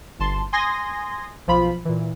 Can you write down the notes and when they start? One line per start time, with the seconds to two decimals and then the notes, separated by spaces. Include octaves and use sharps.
0.19 G1 A5 C6
0.53 G#5 C6 D#6 G#6 A#6
1.47 B1 F3 F4 B5
1.85 A#2 E3